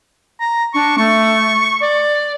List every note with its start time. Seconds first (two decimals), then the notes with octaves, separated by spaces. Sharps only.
0.40 A#5
0.74 D4 C#6
0.98 A3 C#6
1.81 D5